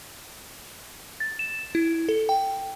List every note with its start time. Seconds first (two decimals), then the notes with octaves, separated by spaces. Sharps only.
1.20 A6
1.39 E7
1.75 E4
2.09 A4
2.29 G5